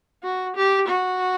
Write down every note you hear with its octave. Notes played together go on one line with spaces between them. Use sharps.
F#4
G4
F#4